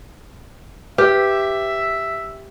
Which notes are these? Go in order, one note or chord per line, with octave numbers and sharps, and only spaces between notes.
G4 B4 E5